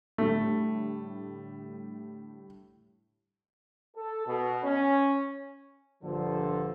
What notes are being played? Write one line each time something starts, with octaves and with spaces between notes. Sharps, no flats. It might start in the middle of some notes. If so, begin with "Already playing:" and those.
A2 D3 G3 A3
A4
B2
C#4
A#1 G2 D3 F3 A4 C5